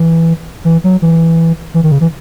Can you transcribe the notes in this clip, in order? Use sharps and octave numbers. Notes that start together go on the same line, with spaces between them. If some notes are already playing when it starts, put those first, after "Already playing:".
Already playing: E3
E3
F#3
E3
E3
D#3
C#3
E3